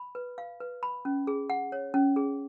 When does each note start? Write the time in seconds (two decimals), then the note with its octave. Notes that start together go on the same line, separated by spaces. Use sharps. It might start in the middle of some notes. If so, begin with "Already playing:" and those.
Already playing: B5
0.15 B4
0.38 F5
0.60 B4
0.83 B5
1.05 C#4
1.27 G#4
1.50 F#5
1.72 C#5
1.94 C#4
2.16 G#4